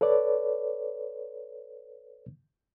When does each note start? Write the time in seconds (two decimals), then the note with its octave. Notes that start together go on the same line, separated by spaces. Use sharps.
0.01 A4 B4 C#5 D5